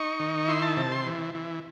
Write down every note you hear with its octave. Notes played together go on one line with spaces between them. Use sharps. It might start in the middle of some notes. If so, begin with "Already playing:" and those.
Already playing: D#4 C#6
D#3
E4 C6
A5
C3 A5
C6
E3
E3